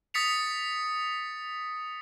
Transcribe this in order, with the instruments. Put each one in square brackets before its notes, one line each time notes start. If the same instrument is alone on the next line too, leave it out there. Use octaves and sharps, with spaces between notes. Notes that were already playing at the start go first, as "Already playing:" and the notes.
[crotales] D#6 A6 B6 C#7 F7